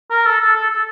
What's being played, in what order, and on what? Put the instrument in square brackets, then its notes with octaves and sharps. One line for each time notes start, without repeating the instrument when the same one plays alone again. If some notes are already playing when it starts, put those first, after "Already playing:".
[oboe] A#4
A4
A4
A4
A4